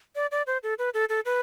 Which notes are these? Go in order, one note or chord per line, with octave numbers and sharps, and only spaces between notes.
D5
D5
C5
A4
B4
A4
A4
B4